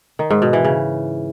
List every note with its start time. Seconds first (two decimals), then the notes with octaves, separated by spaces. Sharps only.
0.19 D#3
0.30 G#2
0.42 B2
0.53 E3
0.64 C#3